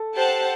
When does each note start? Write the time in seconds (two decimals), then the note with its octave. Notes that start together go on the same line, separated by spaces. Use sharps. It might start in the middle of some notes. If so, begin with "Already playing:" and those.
Already playing: A4
0.16 G4 C5 F#5 A5